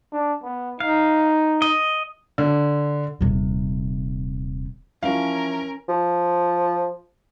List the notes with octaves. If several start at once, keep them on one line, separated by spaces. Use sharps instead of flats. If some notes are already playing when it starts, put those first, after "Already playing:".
D4
B3
D#4 F5
D#5
D3
D#1 C3
E3 F3 C#4 A#4 F5
F3